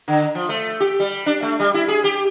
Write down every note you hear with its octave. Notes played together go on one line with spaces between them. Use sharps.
D3
F3
A3
G4
G3
D4
A3
G3
E4
G#4
G4